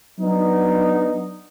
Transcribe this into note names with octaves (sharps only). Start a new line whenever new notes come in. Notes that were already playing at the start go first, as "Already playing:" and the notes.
F#3 B3 D4 D#4